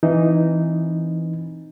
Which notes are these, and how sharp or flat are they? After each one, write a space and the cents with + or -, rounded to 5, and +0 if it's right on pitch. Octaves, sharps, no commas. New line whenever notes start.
E3 +0 C4 +0 D#4 -5